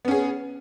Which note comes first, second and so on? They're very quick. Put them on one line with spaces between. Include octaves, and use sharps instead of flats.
B3 C#4 G#4